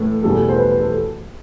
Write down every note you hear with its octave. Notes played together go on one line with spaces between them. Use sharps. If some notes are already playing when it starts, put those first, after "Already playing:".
Already playing: A2 E3 A3
E2 B2 G3 A4
C5
B4
A4